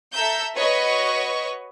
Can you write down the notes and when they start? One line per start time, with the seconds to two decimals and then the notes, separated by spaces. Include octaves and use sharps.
0.13 A4 E5 A#5 E6 G6
0.56 F#4 B4 C#5 D#5 C#6